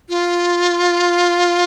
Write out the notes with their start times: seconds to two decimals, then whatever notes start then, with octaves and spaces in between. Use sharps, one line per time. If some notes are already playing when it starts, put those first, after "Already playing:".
0.09 F4